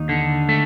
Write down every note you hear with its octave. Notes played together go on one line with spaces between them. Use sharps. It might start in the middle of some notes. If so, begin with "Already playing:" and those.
Already playing: D#2 D#4
D3
A3